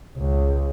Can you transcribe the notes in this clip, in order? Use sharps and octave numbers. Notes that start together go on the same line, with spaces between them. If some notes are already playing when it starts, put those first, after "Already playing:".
C#2